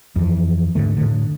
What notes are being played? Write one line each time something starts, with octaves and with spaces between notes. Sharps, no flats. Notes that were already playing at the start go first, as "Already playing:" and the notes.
F2 E3
G#2 D3 A3
A2 D3